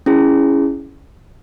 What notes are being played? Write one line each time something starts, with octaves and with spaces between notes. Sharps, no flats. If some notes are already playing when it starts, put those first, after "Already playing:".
C#4 E4 G#4